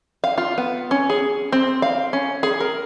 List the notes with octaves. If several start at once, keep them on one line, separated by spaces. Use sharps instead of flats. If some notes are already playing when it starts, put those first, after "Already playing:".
F5
F4
B3
C#4
G#4
C4
F5
C#4
G#4
A#4